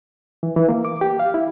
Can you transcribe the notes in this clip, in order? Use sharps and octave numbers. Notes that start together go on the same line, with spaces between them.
E3
E3
A#3
D6
G4
F5
E4